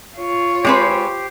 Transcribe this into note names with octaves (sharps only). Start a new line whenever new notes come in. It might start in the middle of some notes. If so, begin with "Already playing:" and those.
F4 C#5
G#3 C4 G4 B4 C5